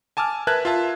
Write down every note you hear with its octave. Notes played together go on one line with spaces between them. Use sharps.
G#5 A5 D6 E6 F6
A#4 B4 E5 A5 F#6 G#6
F4 E5 A5